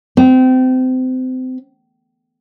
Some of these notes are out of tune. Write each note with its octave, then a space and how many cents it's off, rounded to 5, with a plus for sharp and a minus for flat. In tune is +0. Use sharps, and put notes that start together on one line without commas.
C4 -30